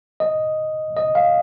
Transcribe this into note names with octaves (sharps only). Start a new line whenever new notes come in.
D#5
D#5
F5